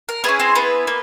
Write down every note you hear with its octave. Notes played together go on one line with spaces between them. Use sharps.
A#4
B3 C#4 E4 G#4 B4
C4 C5
B3 B4
A#3